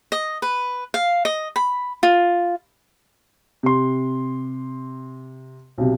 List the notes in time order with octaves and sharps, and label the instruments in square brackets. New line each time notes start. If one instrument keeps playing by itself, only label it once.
[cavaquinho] D#5
B4
F5
D#5
B5
F4
[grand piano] C3 C6
B1 C3